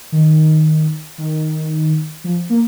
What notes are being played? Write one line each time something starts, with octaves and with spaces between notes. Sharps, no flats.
D#3
D#3
F3
A#3